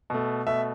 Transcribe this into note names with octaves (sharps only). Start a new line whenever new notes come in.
B2 A3
B2 A3 E5